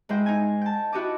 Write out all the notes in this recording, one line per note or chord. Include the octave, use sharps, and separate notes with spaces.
G#2 G#3 E4 C5 G5
D#4 G#5
G5 A5
E4 F#4 G4 D#5 A5 D6